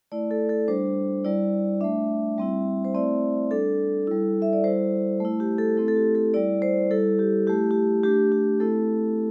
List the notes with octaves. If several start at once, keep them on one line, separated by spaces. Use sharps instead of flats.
A3 E4 D5
A4
A4
G3 D4 C5
G3 E4 D5
A3 D4 E5
G3 C4 E4
C5
A3 C4 E4 D5
G3 D4 A4
G3 E4
E5
D5
G3 E4 C5
A3 E4
G4
A4
A3 C4 E4 A4
A4
G4
A4
G3 E4 D5
C5
G3 E4 A4
G4
A3 E4 G4
G4
A3 D4 G4
G4
A3 C4 E4 A4